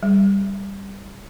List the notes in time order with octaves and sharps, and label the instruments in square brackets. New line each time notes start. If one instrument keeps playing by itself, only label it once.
[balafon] G3